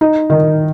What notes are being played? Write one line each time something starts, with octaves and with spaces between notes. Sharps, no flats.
D#4
D#3